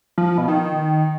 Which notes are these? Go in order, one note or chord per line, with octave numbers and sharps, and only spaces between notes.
F3
F3
B2
D#3